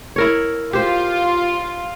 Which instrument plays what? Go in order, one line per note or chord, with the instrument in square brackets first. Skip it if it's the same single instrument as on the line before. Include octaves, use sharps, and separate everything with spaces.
[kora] E4 A#4 C#5
[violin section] F4 [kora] G4 C5